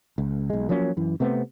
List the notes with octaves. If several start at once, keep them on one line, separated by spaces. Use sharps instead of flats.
C#2
B1 G#3
F3 F#3 A#3 C#4
F#2 E3
C3 A3 B3 C4